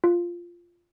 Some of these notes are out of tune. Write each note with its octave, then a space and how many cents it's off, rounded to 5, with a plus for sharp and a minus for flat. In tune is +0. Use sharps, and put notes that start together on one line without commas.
F4 -5